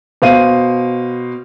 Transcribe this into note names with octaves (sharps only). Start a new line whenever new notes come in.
B2 C5 F5 D#7